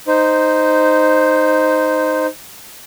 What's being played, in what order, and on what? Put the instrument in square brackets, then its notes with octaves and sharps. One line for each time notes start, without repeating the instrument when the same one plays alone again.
[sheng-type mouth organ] D#4 C5